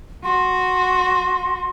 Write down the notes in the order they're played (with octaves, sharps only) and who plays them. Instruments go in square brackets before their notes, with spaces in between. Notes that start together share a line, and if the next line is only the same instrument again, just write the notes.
[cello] F#4 [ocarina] C6